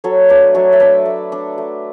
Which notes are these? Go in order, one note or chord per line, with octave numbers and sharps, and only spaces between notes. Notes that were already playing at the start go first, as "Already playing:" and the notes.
F#3 A4 C#5
A3 D4 B4 D5
F#3 A4 C#5
E5
A3 D4 B4 D5
A3
D4
A3